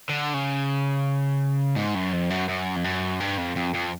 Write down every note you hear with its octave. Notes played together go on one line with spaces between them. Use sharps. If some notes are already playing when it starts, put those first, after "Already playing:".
D3
C#3
G#2
F#2
F2
F#2
F#2
F2
F#2
G2
F2
F2
F2